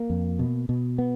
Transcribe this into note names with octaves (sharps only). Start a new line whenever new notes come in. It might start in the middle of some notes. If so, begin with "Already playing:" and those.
Already playing: A#3
F2
B2
B2
B3